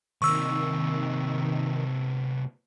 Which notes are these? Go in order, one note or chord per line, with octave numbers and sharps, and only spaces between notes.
C3 D#3 A#3 C#6 E6